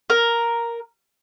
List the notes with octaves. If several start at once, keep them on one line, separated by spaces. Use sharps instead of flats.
A#4